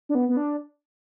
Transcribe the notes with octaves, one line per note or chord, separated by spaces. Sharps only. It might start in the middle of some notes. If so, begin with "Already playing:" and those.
D4
B3
B3
D4